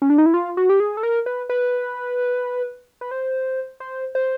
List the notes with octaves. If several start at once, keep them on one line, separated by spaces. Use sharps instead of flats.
C#4
D4
D#4
E4
F4
F#4
G4
G#4
A4
A#4
B4
B4
B4
C5
C5
C5